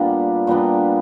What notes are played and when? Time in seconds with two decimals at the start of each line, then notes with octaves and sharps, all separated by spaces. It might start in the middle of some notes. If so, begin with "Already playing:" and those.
Already playing: A#2 G3 B3 D4
0.47 A#2 G3 B3 D4